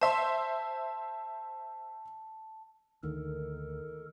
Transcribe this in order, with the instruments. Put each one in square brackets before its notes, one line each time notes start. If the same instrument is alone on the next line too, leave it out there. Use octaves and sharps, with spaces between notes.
[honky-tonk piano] C5 E5 C6 [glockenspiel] A5
[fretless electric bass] D2 [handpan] D#3 [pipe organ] A4 A#4